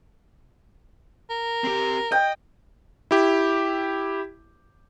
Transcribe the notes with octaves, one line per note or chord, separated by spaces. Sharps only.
A#4
C4 G4
D#5 G5
E4 G4